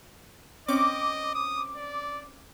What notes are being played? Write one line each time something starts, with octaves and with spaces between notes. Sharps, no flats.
C4 C#4 D#5 D6
D#6
D5